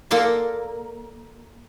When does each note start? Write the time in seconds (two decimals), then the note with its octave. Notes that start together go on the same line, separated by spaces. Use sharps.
0.11 A#3 A4 A#4 D5 C6